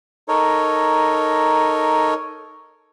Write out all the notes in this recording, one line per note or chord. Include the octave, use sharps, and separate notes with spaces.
D#4 A4 A#4 C#5